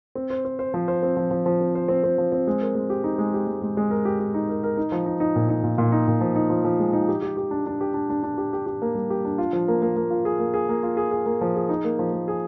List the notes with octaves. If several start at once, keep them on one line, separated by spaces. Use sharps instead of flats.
C4
C5
C5
C5
F3
C5
C4
F3
F3
F3
C4
C5
C4
C4
F3
C4
G#3
A#4
G#3
G4
D#4
G#3
G4
G#3
G#3
G#3
A#4
G4
G4
D#4
A#4
A#4
D#4
F3
D#4
D#4
A#2
D#4
A#2
A#2
D#4
A#2
F3
D#4
F3
F3
G#3
D#4
G4
G4
G4
D4
D4
G4
D4
D4
D4
G4
G4
G4
A#3
G3
G4
D4
F4
F3
A#3
A#3
A#3
F4
G#4
A#3
G#4
A#3
F4
G#4
G#4
A#3
F3
G#4
D#4
A#3
F3
A#3
G#4